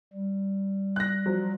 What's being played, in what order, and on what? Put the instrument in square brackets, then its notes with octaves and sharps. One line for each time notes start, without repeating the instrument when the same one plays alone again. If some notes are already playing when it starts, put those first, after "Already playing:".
[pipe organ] G3
[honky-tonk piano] F#6 A#6
F3 F#3